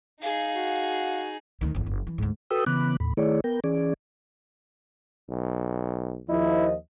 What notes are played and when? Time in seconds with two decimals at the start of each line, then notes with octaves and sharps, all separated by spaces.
0.22 D#4 G#4 F5
0.54 F#4
1.61 D2 D#3
1.75 G1 E2
1.87 F#1
2.07 E3
2.18 D2 G#2
2.51 F#4 A4 B4 G5 D#6 E6
2.66 C#3 E3 B3 B5 D6 F#6
3.00 D#2 A2 B5
3.17 D#3 A3 E4 G#4 C#5 D5
3.44 B3 A#4 G5
3.64 E3 C#4 G#4 D5
5.30 B1
6.29 D#2 F3 E4 D#5